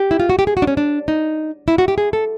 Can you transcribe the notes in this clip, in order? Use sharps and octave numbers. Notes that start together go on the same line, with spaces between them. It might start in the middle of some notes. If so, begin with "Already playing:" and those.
Already playing: G4
E4
F4
F#4
G4
G#4
F#4
D4
C#4
D4
D#4
E4
F#4
G4
G#4
A4